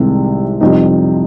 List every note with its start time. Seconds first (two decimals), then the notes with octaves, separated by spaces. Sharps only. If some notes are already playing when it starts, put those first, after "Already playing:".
Already playing: C2 C3 D#3 G#3
0.61 F2 C3 G3 C4 D#4